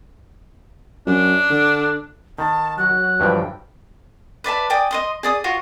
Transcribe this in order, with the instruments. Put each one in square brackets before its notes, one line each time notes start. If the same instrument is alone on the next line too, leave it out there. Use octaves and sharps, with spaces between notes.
[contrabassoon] F#2 [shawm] D4
[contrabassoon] D3
[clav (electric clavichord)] D#3 [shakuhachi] A5
[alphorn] F#3 [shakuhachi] F#4 [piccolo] F#6
[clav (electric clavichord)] G2 E3 F3 [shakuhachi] G5
[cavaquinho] B4 D5 E5 A5
D5 G5 G#5 D#6
D#5 C6 D#6
G#4 D5 D#6
F4 F#4 C#5